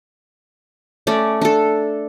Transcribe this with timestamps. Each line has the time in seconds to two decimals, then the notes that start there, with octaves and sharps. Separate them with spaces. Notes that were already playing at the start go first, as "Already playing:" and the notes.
1.07 A3 C#4 D5
1.41 D4 A4